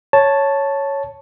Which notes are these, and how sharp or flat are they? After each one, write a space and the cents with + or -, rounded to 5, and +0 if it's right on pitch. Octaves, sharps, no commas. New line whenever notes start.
C#5 +0 A5 +0